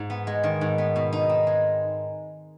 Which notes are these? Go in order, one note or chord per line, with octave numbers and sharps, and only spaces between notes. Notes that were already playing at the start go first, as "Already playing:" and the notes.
Already playing: G#2
B3
G#3
D#3
G#2
B3
B2
D#4
C4
G#3